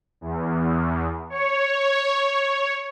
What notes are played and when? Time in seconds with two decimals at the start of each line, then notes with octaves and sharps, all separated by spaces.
0.21 E2
1.30 C#5